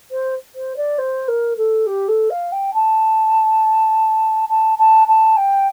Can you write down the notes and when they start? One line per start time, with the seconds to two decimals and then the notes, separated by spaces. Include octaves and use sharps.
0.11 C5
0.55 C5
0.76 D5
0.98 C5
1.28 A#4
1.57 A4
1.86 G4
2.08 A4
2.30 F5
2.52 G5
2.74 A5
4.49 A5
4.78 A5
5.07 A5
5.36 G5